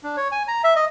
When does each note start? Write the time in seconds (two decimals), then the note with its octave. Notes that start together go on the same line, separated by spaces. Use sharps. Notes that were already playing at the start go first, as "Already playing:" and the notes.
0.03 D4
0.17 C#5
0.32 G#5
0.48 A#5
0.64 E5
0.76 D#5